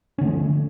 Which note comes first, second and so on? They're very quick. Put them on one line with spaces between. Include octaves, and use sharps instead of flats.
C#4 D3 A3 F3